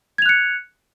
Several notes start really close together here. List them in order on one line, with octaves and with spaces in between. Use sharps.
G#6 F7 F#6 C#7